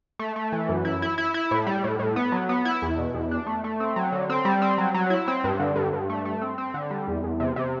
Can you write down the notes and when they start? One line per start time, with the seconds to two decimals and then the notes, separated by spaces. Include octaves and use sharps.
0.19 A3
0.36 A3
0.52 E3
0.69 F#2
0.85 E4
1.02 E4
1.18 E4
1.34 E4
1.51 A2
1.67 G3
1.84 A2
1.99 A2
2.16 B3
2.32 F#3
2.49 B3
2.65 E4
2.82 E2
2.98 B2
3.14 E2
3.31 D4
3.47 A3
3.64 A3
3.80 C4
3.96 F#3
4.12 D3
4.30 C4
4.45 G3
4.62 C4
4.78 F#3
4.94 F#3
5.10 E4
5.28 C4
5.44 G2
5.59 D3
5.76 G2
5.93 G2
6.10 A3
6.25 A3
6.42 C4
6.58 C4
6.74 D3
6.91 G3
7.08 E2
7.24 E2
7.40 C3
7.56 C3